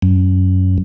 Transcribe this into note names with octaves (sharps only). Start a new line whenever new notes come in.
F#2